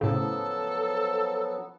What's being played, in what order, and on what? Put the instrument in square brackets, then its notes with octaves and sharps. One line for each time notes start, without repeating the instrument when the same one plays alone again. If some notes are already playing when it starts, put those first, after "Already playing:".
[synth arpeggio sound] A2 C#3 [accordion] F3 F#3 B3 [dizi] A4